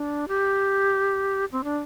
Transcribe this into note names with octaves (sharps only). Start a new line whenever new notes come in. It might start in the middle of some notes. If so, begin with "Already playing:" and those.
Already playing: D4
G4
C4
D4